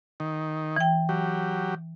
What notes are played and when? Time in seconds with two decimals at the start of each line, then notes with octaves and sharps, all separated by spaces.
0.20 D#3
0.76 E3 G5
1.09 F#3 G4